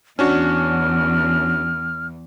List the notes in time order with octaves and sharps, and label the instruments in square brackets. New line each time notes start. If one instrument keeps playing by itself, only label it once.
[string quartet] E2 [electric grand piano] C#4 D4 F#4 [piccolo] F6